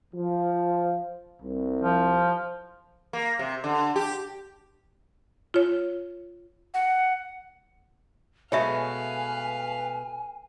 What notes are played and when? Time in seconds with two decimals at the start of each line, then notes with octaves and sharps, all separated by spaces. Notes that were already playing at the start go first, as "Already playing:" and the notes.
0.14 F3
1.41 C2
1.81 F3
3.13 A#3
3.39 C3
3.64 D3
3.96 G4
5.54 F4 C#5
6.74 F#5
8.52 B2 G#3 A3 B4 C#5 E5 F5 G#5